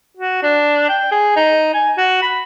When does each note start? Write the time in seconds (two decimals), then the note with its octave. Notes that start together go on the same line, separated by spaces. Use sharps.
0.17 F#4
0.43 D4
0.89 G5
1.11 G#4
1.36 D#4
1.74 G#5
1.97 F#4
2.22 B5